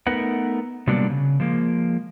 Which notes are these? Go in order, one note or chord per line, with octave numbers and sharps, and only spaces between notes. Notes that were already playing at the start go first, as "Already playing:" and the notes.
A3 B3 D#4 A#4 B4 F#5
C3 F#3 G3 A#3 B3 D4
C#3
F3 G#3 A#3